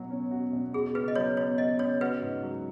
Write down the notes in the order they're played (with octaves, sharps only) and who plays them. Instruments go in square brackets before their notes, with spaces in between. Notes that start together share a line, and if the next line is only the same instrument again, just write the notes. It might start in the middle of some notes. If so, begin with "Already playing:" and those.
Already playing: [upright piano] B2 F#3 F#4
C#4
F#4
B2
[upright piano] F#4 [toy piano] G#4
[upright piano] C#3 [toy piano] B4
[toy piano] D#5
[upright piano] F#3 [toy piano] C#5
[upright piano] B3 [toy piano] C#5
[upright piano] F#4 [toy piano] D#5
[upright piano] C#3 [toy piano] C#5
[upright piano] F#4 [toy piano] B4
[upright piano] G#2
F#3